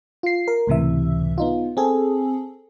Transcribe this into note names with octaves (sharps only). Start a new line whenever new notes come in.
F4 C7
A#4
C#2 A2 C3 E3 E5
B3 D#4 F4
C4 G#4 A4